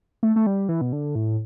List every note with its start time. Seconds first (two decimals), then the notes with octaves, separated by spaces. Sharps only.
0.23 A3
0.36 A3
0.47 G3
0.69 E3
0.81 B2
0.93 D3
1.15 A2